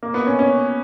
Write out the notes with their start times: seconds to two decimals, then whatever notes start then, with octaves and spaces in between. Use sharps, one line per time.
0.03 A#3
0.14 B3
0.27 C#4
0.39 C#4